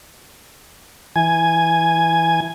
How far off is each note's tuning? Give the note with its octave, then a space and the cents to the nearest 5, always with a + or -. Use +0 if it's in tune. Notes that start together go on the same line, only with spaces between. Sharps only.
E3 +0 G#5 +0